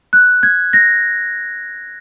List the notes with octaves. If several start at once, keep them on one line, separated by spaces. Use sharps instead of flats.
F#6
G#6
A#6